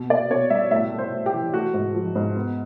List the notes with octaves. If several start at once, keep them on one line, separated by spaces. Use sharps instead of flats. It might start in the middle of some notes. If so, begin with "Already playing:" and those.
Already playing: B2
A#3 D5
B2 C#5
G3 E5
A2 E5
A3
C5
A2
G4
E3
A3 F#4
G#2
F3
G#2
B3